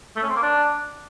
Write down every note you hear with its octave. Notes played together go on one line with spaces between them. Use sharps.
A3
C#4
C4
A#3
D4